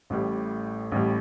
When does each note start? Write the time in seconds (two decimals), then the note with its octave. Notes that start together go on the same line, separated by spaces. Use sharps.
0.10 A1 A2 G3
0.92 A1 A2 G3